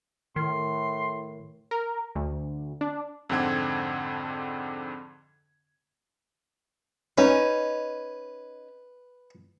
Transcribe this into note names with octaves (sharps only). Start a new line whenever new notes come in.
A2 D#3 C6
A#4
D2
D4
F2 G#2 D3 C4 F#5 G#6
C#4 D#4 B4